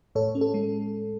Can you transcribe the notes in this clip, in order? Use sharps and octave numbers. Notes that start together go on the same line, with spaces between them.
A2 A4 C#5
C#4
A4
G#3